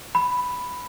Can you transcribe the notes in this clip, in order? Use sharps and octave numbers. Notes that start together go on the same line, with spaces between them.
B5